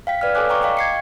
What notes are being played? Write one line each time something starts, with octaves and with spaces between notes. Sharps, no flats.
F5 G5 B6
B4 D5 F5 F6
A4 C#5 D5 G#5 D6 F#6
G5 A#5 C#6 D6
D#5 F5 G5 C#6
G#6 C7 C#7